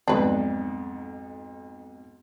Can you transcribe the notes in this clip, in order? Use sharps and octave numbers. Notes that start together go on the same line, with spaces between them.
B1 F2 G#2 D4 B4